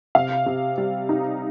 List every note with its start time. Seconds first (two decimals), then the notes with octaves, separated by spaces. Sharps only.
0.15 C3 F5
0.46 C3
0.78 G3
1.09 D#4